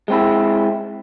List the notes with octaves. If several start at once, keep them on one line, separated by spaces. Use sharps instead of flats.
G#3 C4 E4